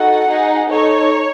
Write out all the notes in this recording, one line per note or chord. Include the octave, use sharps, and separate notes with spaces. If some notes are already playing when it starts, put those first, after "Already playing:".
Already playing: D#4 F#4 A4 F#5
D#4 G#4
D#4 A4 C#5